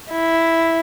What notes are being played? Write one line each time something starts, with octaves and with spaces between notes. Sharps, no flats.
E4